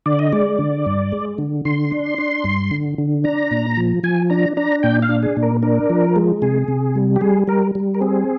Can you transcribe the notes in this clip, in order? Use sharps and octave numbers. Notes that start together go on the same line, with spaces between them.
D3 D5
D#5
G#3 D5
D3
G2
G#3
D3
D3 C6
D4
D4
G2
D3
D3
D4 A#5
A#2
F3
F3 G#5
D4 A#5
D4 A#5
A#2 G5
F5
D4
G#4
A#2
A#4
D4 A#4
F3
G#3
C3 G#4
C3
G3
G4
G3 G#4
G3 A#4
G3
A#4
C4 G#4